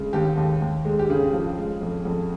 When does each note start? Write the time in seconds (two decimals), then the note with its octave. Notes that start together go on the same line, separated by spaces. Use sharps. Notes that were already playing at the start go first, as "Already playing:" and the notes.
Already playing: C#3 G#3
0.13 D#2 G4
0.37 D#2
0.62 D#2
0.85 G#3
0.99 G4
1.10 C#3 G#4
1.33 F3
1.57 G#3
1.81 F2
2.05 F2